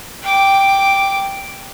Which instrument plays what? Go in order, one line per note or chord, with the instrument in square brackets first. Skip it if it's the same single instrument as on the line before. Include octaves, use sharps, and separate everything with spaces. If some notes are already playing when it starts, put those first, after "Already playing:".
[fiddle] G5 D6